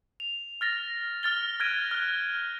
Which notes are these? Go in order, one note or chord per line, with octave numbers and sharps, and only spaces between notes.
F7
F6 A6 A#6
F6 A6 G7
F6 F#6 G#6 A#6 D7 D#7
F6 F#6